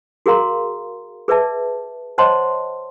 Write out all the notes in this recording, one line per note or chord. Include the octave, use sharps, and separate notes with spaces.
F#4 G#4 A#4 F5 A#5 C6
G#4 B4 D5 E5 A5
C5 C#5 D#5 F#5 A5 C6